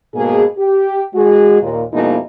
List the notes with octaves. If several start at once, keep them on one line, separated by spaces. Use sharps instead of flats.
G#2 B2 A#3 G#4
G4
G#3 F#4 G#4
D#2 A#2
F2 B2 G#3 A#3 D#4 E4